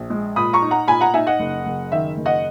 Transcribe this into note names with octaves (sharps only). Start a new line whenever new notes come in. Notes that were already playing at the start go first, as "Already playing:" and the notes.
Already playing: A#1
G#3
A#2 B5 D#6
A#5 C#6
D#4
F#5 A#5
A#2 G#5 B5
F#5 A#5
D#4 E5 G#5
D#5 F#5
F#1
F#1
D#3 E5
F#1
D#5 F#5